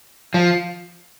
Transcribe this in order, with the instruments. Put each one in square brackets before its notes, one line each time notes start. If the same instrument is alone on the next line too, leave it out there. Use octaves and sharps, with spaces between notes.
[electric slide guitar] F3